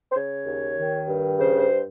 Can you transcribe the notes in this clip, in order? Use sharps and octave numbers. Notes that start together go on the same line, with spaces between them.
C5
C#3 C#5
D#2
D#3
G2
C#3 C5
C5